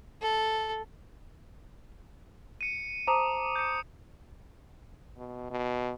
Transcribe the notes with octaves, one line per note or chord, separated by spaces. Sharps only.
A4
C#7 D#7
C5 A5 A#5 D6 D#6 D#7
G6 C#7
B2
B2